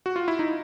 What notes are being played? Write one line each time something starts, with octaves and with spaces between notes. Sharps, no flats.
F#4
F4
E4
D#4